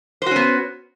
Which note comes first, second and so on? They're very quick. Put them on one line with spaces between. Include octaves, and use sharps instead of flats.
C5 F#4 C#4 B3